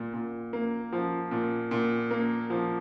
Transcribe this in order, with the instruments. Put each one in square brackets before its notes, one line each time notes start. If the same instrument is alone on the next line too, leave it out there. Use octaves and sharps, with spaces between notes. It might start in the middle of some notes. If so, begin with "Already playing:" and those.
Already playing: [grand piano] A#2
A#2
A#3
F3
A#2
A#2
A#3
F3